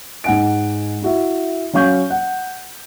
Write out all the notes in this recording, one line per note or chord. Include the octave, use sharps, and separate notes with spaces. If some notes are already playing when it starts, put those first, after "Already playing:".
G#2 D#4 F#5 G#5 D7
E4 F#4 E5
F#3 C#4 F5 C#6 G6
F#5